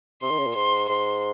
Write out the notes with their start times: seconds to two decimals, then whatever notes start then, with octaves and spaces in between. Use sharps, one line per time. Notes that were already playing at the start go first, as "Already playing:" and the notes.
0.22 C3 C6
0.31 D#3
0.39 C#3
0.47 A#2
0.55 G#2 C6
0.88 G#2 C6